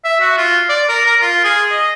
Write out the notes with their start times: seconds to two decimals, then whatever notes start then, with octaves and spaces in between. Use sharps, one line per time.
0.04 E5
0.20 F#4
0.37 F4
0.69 D5
0.89 A#4
1.06 A#4
1.22 F4
1.44 G#4
1.71 D#5